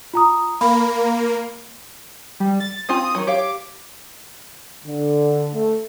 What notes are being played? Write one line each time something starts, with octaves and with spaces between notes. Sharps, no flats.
F4 A#5 D#6
A#3 B5
G3
A6
C4 F4 G#5 D#6
D#3 F3 F#3
G4 C#5 F5 D6
D3
A3